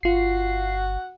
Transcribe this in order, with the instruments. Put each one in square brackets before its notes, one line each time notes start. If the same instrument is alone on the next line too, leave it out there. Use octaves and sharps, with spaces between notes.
[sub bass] G1 [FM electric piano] F4 C7 [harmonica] F#4 F#5